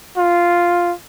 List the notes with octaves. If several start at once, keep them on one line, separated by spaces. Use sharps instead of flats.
F4